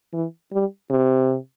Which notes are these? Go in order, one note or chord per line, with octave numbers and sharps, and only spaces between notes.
E3
G3
C3